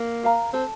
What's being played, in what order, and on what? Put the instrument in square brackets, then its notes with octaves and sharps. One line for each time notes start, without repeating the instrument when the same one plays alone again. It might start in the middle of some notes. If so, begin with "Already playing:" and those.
Already playing: [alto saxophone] A#3
[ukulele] A#4 F5 A#5
[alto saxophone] C4 [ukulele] A4